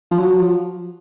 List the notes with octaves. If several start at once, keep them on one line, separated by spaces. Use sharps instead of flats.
F3
F#3
F3